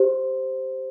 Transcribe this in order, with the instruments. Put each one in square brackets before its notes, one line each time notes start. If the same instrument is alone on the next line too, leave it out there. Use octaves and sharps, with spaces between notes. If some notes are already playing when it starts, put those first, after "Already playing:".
Already playing: [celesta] G4 C5